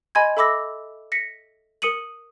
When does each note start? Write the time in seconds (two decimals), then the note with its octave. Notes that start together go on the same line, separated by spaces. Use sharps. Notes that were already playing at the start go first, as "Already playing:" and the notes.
0.15 D#5 G#5 B5 C6 G#6
0.37 A4 E5 B5 D6 E6 A#6
1.12 A#6 B6 C#7
1.82 A#4 D#6 C#7 D#7 F#7